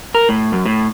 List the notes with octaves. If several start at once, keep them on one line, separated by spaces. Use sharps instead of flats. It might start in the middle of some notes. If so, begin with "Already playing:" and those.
A#4
A2
F#2
A2